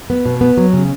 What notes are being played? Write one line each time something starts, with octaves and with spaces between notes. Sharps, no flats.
B3
B2
B3
F#3
C#3